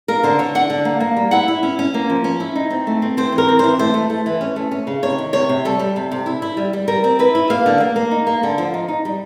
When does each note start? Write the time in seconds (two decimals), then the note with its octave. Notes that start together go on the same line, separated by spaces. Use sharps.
0.08 A#3 A#4
0.23 D3 C5
0.39 D3 C#5
0.55 D4 F#5
0.70 D3
0.85 A#3
1.00 A#3
1.17 G3
1.31 E4 F#5
1.48 E4
1.63 C#4
1.79 C#4
1.94 A#3
2.10 F3
2.24 C#4
2.40 E4
2.56 D#4
2.70 C4
2.87 A3
3.02 C4
3.17 C4 C5
3.32 E3
3.38 A#4
3.49 C4
3.59 E3 C5
3.79 A3 C5
3.94 A3
4.10 A3
4.26 E3
4.41 C#4
4.56 A3
4.71 C#4
4.87 C#3
5.03 C3 C#5
5.18 D#3
5.33 C3 C#5
5.49 C3
5.65 G3 A4
5.79 G3
5.96 C3
6.11 C3
6.26 E4
6.42 E4
6.57 G3
6.73 G3
6.88 G3 A#4
7.04 C4
7.19 E4 B4
7.35 E4
7.50 A#3 F5
7.66 D3
7.80 A#3
7.96 A#3
8.11 D#4
8.27 A#3
8.43 D3
8.58 F3
8.74 D#4
8.88 D#4
9.05 G3